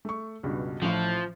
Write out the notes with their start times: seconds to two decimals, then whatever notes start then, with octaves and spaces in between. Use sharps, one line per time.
0.05 A3 C#6
0.43 C#2 G2 B2
0.82 A1 A2 F3